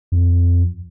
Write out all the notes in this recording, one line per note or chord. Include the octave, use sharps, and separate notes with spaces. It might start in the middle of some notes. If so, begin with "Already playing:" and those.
F2